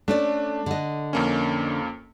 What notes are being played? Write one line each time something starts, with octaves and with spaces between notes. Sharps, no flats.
A3 C#4 D4 D5
D3 D#5
F2 A#3 C#4